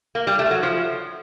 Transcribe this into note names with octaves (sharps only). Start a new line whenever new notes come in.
A#3
G3
A3
F#3
F3